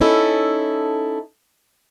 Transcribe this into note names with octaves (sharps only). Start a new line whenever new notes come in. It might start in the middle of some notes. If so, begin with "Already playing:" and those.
C#4 D#4 E4 A4